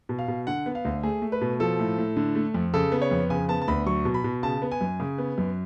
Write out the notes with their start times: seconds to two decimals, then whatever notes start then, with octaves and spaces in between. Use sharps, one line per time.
0.09 B2
0.19 F5
0.28 B2
0.47 D3 F#5
0.66 B3
0.75 F5
0.85 D2
1.03 A3 G#4
1.22 A3
1.32 B4
1.41 B2
1.60 F3 A4
1.79 A2
1.98 A2
2.17 D3
2.35 A3
2.54 F2
2.74 C#3 A4
2.92 B3
3.02 C#5
3.11 F2
3.30 C#3 G#5
3.49 B3 A5
3.62 A5
3.68 D2 B5
3.86 F#3 C#6
4.05 B2
4.14 B5
4.24 B2
4.43 C#3 A5
4.62 B3
4.71 G#5
4.81 F#2
5.00 C#3
5.18 B3
5.38 F#2